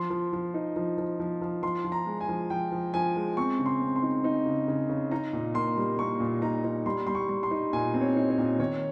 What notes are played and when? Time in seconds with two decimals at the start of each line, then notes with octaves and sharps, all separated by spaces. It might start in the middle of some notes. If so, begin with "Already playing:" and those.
Already playing: F3 C6
0.10 F3
0.33 F3
0.54 D#4
0.76 F3
0.98 F3
1.20 F3
1.41 F3
1.63 F3 C6
1.84 F3
1.92 A#5
2.06 G#3
2.21 G#5
2.29 F3
2.50 F3 G5
2.72 F3
2.94 F3 G#5
3.16 G#3
3.37 C4 C#6
3.59 C#3
3.66 C6
3.80 C4
3.96 C6
4.02 D#4
4.24 D#4
4.46 C#3
4.68 C#3
4.89 C#3
5.11 D#4 A#5
5.33 A#2
5.54 A#3 C6
5.77 G3
5.98 A#3 C#6
6.20 A#2
6.42 D#4 A#5
6.64 D#4
6.86 G3 C6
7.07 G3 C6
7.15 C#6
7.29 G3
7.43 C6
7.51 D#4
7.73 A#2 G#5
7.94 C4
8.01 C#5
8.16 D#4
8.30 C#5
8.38 A#2
8.59 D#3 C#5